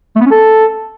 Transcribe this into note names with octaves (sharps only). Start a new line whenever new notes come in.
A3
B3
C#4
A4